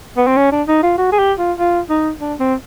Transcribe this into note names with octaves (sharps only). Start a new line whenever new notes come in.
B3
C4
C#4
D4
D#4
F4
F#4
G#4
G4
F4
F4
D#4
D4
C4